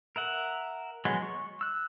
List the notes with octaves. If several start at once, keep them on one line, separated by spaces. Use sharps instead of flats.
A#4 E5 F#5
F#3 G#3 B3
C#6
E6 F#6